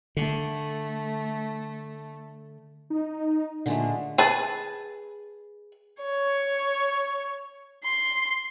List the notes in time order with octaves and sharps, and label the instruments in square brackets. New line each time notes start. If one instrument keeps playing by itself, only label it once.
[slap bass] D3 [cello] A3
[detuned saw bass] D#4
[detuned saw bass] A#2 [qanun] D3 G#3 A3
[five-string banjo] G#4 B4 A5
[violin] C#5
C6